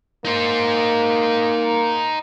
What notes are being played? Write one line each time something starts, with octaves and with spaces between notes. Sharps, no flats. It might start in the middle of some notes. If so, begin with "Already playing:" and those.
A#3 D#4 C5